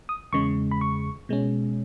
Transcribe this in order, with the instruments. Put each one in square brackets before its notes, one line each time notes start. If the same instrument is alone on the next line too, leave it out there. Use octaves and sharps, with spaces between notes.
[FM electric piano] D#6
E2 C#3 G#3 C#6
B5
C#6
B2 G#3 C#4